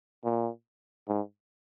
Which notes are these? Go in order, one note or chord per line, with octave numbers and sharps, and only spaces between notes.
A#2
G#2